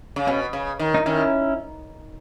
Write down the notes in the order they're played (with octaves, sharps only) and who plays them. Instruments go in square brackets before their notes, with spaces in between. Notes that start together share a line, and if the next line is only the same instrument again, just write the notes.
[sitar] C#3
[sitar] B2 [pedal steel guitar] C#4
[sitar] C#3
D#3
[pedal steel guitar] D#4
[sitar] D#3 [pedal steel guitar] C#4 E4